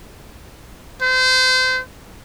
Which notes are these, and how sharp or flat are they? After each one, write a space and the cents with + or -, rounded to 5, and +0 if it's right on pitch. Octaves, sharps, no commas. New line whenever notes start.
C5 -30